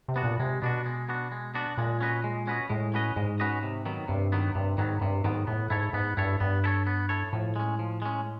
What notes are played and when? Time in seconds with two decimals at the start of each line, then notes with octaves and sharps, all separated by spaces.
0.08 C3
0.16 B3 D4 F#4
0.24 A#2
0.40 C3 G#3
0.62 B2 B3 D4 F#4
0.86 G#3
1.09 B3 D4 F#4
1.32 G#3
1.54 B3 D4 F#4
1.78 A#2 G#3
2.01 C#4 F#4 B4 D#5
2.24 G#3
2.47 C#4 F#4 B4 D#5
2.70 A2 G#3
2.94 C#4 F#4 B4 D#5
3.16 G#2 G#3
3.40 C#4 F#4 B4 D#5
3.63 C3
3.85 D#3 F#3 B3
4.08 G2 C3
4.32 D#3 F#3 B3
4.55 G2 C3
4.78 G#2 D#3 F#3 B3
5.01 G2 C3
5.24 G#2 D#3 F#3 B3
5.47 A2 B3
5.70 G#2 E4 A4 C#5
5.93 G#2 B3
6.17 G2 E4 A4 C#5
6.40 G2 B3
6.64 E4 A4 C#5
6.86 B3
7.09 E4 A4 C#5
7.33 A2 F3
7.56 G#3 C#4
7.79 F3
8.02 G#3 C#4